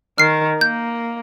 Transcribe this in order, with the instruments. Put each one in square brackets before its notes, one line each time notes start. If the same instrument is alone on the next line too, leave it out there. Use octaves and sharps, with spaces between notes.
[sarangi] D#3 [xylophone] F6 C7
[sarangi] A#3 [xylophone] G6